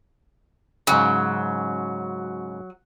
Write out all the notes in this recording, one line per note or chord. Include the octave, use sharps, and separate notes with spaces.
G#2 C#3 F#3